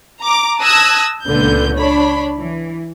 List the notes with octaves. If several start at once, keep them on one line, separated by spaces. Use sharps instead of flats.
A#5 D6
A5 D#6 E6 F#6 G#6 A#6
C#2 A#2 D3 B3 G6
D4 C#5 B5
E3